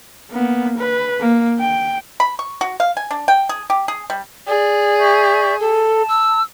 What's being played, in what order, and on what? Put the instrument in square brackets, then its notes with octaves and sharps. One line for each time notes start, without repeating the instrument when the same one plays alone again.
[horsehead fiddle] A#3 B3
B4
A#3
G5
[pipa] B5
C#6
F#4
F5
G#5
D4
G5
G#4
G4
G#4
G3
[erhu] G#4 [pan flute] D5
[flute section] E5 C#6 G6
[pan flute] A4 [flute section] A5
[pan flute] E6